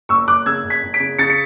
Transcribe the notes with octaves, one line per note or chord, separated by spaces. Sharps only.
F#1 C#6 E6
F#1 D6 F#6
C#3 E6 G#6
F#1
G#6 B6
F#1
B6 D7
C#3
C#3 A6 C#7
C#7